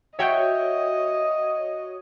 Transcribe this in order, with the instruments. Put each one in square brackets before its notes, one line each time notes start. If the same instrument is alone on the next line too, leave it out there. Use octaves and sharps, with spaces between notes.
[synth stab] F#4 C#5 [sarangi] D#5 [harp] E5 G5 G6